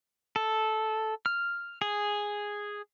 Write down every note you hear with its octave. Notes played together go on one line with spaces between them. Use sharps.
A4
F6
G#4